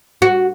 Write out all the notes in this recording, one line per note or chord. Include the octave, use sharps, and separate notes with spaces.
F#4